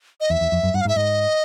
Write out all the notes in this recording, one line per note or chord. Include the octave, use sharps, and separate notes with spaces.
D#5
E2 E5
E2
F2
F#2
G2 F#5
F5
G#2
E5
G#2 D#5